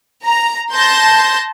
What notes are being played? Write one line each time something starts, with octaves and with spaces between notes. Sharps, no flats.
A#5
A5 C6 G6 A#6